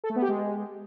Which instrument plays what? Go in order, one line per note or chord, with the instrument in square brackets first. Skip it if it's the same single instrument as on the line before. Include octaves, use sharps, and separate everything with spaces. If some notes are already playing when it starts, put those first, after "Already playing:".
[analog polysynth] A4
A3
B3
G4
G#3